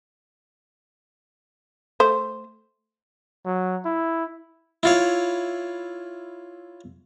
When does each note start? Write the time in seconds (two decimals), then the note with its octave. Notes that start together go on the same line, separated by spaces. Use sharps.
2.00 A3 C5
3.46 F#3
3.85 E4
4.83 E4 F4 C#5